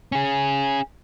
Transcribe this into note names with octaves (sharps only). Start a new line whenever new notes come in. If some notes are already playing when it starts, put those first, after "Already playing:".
C#4 G#4